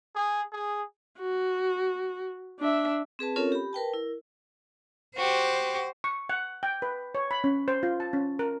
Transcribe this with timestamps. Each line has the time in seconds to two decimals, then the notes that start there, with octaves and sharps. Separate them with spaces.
0.14 G#4
0.53 G#4
1.19 F#4
2.60 D4 E5
3.19 C4 G#4 B4 A5
3.36 C4 C#4 F4 A4 A#4 C#5
3.52 G4 B5
3.73 A#4 B4 G5 A5
3.94 E4 A#4
5.17 F#4 G4 C5
6.04 C#6
6.29 F#5
6.63 G5
6.82 B4
7.15 C#5
7.31 B5
7.44 C#4
7.68 C5
7.83 F4
8.00 A5
8.13 C#4
8.39 A#4